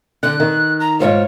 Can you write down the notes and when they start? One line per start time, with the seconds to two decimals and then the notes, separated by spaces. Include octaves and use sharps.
0.23 D3 F#6
0.40 D#3
0.80 A#5
1.00 G#2 F4 C5 C#5